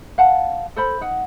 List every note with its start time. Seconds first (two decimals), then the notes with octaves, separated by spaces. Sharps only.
0.18 F5 F#5 A5
0.76 A4 C5 B5
1.01 D#4 F#5